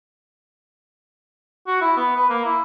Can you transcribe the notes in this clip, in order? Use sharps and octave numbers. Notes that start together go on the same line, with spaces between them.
F#4
E4
B3
B4
A#3
E4